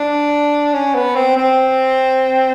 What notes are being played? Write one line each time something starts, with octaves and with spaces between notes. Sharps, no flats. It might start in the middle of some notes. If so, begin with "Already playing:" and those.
Already playing: D4
C#4
B3
C4
C4